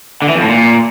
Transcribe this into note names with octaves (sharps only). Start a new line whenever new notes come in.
D3
E3
F2
A2
A#2